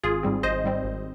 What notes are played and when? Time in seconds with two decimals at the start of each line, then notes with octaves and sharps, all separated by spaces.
0.04 G#1 F4 G#4
0.23 G#2 G3 C4
0.43 G#1 C5 D#5
0.64 G#2 G3 C4
0.84 G#1